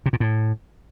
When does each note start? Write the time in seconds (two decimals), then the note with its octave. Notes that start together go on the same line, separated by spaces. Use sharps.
0.06 C3
0.13 A#2
0.20 A2